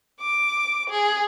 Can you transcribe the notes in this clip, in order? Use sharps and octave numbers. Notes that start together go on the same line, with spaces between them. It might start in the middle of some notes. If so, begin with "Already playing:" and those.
D6
G#4